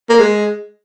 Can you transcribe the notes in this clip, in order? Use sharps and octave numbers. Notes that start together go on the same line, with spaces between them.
A#3
G#3